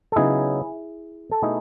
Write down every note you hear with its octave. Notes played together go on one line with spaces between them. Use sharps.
A4
C#3 F#3 B3 D#4 E4 G#4
A4
B2 A3 D#4 E4 G#4